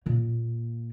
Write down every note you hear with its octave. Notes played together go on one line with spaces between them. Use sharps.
A#2 A#3